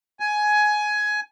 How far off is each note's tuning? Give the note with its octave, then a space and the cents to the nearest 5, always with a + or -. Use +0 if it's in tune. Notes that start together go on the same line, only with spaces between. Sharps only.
G#5 +15